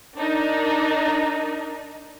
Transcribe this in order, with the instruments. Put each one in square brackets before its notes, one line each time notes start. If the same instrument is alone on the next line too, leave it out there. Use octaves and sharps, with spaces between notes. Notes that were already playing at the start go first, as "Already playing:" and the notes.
[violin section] D4 D#4 A#4